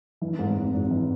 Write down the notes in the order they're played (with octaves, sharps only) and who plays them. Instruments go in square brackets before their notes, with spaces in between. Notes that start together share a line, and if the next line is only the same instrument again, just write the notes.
[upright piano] E3
G#2
G#1
G#1
E3